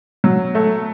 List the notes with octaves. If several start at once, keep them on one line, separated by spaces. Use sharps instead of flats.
F#3
A3